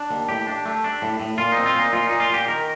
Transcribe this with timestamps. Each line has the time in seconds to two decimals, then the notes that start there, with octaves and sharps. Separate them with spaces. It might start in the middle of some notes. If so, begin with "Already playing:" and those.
Already playing: D4
0.11 D#2
0.29 A2 G4
0.47 D4
0.66 A3
0.84 D4
1.02 A2
1.20 A2
1.38 A#2 F4
1.52 D#4
1.57 C4
1.66 F4
1.75 A#2 D#4
1.93 A#2 F4
2.07 A#2 D#4
2.20 F4
2.30 A#2 G4
2.48 D#3 A#4